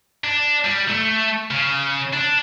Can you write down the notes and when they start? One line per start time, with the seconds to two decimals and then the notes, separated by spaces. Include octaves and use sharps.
0.24 D4
0.64 G3
0.88 A3
1.51 C#3
2.13 D4